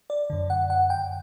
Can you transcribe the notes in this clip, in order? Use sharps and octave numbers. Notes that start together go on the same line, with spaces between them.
D5
F#2 D3
F#5
F#5
G5